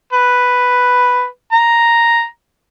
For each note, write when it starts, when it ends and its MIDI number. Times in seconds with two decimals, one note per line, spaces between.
0.13 1.26 71
1.52 2.25 82